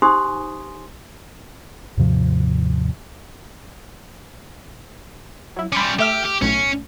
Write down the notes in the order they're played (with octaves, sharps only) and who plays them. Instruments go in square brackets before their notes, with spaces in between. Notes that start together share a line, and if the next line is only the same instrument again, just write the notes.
[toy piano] D#4 G4 C5 G#5 C6 D#6
[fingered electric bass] D#2 G#2 C3 F3
[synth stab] F#3 E4
[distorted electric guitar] G3 C#4 [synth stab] B5 C6 D6
[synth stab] A3 E5 F6 [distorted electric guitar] G4
[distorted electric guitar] G4
[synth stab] B1 A2 A3 [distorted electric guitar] C#4